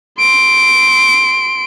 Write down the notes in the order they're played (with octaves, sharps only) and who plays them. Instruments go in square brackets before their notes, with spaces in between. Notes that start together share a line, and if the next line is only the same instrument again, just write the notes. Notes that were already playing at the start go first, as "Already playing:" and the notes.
[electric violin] C6 D7